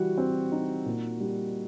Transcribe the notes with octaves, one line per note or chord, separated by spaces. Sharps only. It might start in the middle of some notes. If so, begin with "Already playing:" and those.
Already playing: E3 G3 F#4
C4
D#4
A#2
G3